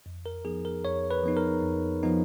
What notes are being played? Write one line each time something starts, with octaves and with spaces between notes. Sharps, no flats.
F2
A#4
F3 B3 D#4 G#4
A#4
F2 C#5
B4
F3 B3 D#4
A#4
F2
F3 B3 D#4